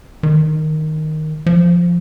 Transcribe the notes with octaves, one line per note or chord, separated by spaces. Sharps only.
D#3
F3